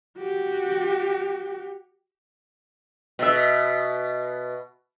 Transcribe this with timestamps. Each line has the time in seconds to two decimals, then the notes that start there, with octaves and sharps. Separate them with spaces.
0.19 F#4 G4
3.19 B2 E5